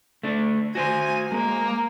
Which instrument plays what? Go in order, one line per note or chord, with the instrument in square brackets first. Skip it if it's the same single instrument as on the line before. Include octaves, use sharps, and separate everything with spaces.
[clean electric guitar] A3 D4
[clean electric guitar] F#4 C5 C6 [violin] G#5
[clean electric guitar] G#3 [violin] A#3